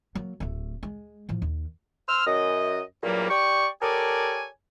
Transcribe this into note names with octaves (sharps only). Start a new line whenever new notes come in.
F#3 A#3
D1 A3
G#3
A2 F3
D#2
C5 C6 E6 F6
F#2 D#5
E2 G2 A#2 F#3 G3 A#3
G4 D5 G5 C#6
G4 A4 A#4 C#5 D5 G#5